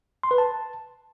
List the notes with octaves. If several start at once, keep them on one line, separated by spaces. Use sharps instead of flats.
C6
B4
A5